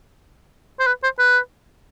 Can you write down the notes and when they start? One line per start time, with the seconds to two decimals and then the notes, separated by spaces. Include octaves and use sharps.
0.80 C5
0.87 B4
1.03 C5
1.19 B4